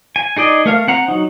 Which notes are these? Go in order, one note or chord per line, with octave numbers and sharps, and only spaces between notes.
G#5
D#4 G#4 D5 D#5
A3 A#4 F5
C4 F#5 A#5
F#3 D#4